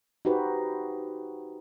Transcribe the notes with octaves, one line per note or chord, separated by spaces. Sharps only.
D#4 F#4 G4 B4 C5